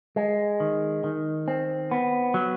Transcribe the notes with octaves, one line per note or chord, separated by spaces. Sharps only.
G#3
D#3
D#3
C4
B3
F#3